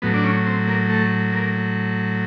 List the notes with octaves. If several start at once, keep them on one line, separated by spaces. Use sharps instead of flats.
A2 F#3 B3
D4
C#4
C4
A#3
A3
A#3